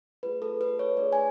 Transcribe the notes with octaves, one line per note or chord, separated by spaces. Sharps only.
A3 F4 G#4 B4
A4
B4
C#5
A3 D4 G#4 D5
G#5